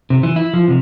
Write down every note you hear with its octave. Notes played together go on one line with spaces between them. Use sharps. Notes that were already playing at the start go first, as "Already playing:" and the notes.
C3
E3
E4
F3
C3